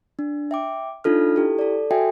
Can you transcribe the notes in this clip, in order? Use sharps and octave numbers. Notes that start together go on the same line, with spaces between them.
D4
E5 G5 D6
D4 D#4 F4 A4 F6
E4 G4 A4
A4 D5
F#4 A4 E5 G5 G#5